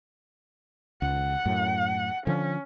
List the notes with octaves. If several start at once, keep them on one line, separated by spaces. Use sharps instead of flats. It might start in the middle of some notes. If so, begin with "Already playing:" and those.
C#2 F#5
F#2 A2
D3 F3 C#4